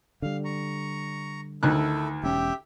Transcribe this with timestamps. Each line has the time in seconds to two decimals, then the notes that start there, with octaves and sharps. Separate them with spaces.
0.22 D3 G3 F5
0.45 A#5 C#6
1.63 D2 D#3 E4 A4 F#6
2.23 E1 C#4 G4 E5 G5